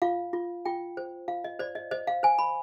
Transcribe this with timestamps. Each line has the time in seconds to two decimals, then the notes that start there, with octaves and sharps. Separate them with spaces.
0.02 F4 F5
0.33 F4
0.65 F4 G5
0.97 C5
1.28 F4 F5
1.44 D#5
1.59 C5 D5
1.75 D#5
1.91 C5 D#5
2.07 F5
2.23 C5 G#5
2.39 B5